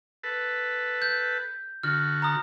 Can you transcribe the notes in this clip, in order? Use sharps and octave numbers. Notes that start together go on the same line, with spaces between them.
A4 B4
G6
D3 F#4 F6
A#5 D#6